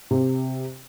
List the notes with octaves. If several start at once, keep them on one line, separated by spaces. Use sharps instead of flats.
C3